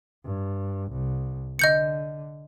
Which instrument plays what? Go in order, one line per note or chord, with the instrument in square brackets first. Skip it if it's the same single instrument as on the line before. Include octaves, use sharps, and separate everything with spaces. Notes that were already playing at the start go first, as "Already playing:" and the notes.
[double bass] G2
C2
[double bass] D3 [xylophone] D#5 G6 C#7